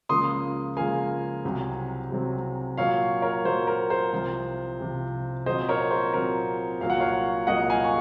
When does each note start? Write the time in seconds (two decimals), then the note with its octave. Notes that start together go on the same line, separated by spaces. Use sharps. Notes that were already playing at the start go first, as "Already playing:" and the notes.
0.09 C#2 C#3 F3 A#3 C6 D#6
0.77 C#2 C#3 F3 A#3 F5 G#5
1.44 C2 C3 F#3 C4
2.11 C2 C3 F#3 C4
2.78 A#2 F#3 A#3 C#5 F5
3.22 A#4 C#5
3.45 A#2 F#3 A#3 C5
3.67 A#4
3.90 C5
4.13 C2 C3 F3
4.79 C2 C3 F3
5.46 A#2 F#3 C4 C5 D#5
5.68 A#4 C#5
5.91 C5
6.13 A#2 F#3 C4 A#4
6.81 C2 A#2 F#3 A#3 F5
6.90 F#5
7.00 C#5 F5
7.47 C2 A#2 F#3 A#3 D#5 F#5
7.70 F5 G#5
7.84 C#6